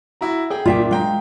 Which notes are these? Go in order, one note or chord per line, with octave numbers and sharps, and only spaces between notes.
E4 F#4 A#5
G#4 G5
A#2 D4 F4 E5 G5
G#3 F5 G5 A#5